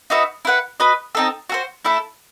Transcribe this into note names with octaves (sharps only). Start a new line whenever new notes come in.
D#4 F#4 B4 E5
E4 B4 F#5
F#4 B4 D#5
C4 D#4 A4
F#4 A4 C5
A3 E4 A4 E5